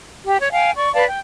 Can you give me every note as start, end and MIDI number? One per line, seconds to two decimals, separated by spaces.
0.25 0.38 67
0.40 0.48 73
0.51 0.70 77
0.51 0.70 79
0.51 0.70 80
0.75 0.93 74
0.75 0.93 85
0.93 1.04 71
0.93 1.04 74
0.93 1.04 77
0.93 1.04 81
1.07 1.20 79